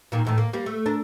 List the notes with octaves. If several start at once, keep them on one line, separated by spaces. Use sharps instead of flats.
A#2 D#3 A#3
E2 A2 D#3
A#3
G3 A#3
A3
D4 A#4